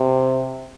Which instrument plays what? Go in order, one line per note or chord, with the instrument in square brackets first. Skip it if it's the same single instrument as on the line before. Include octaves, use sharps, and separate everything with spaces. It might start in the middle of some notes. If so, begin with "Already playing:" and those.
Already playing: [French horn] C3